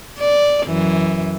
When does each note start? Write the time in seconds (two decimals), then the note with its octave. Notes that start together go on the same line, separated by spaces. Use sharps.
0.19 D5
0.65 F#2 E3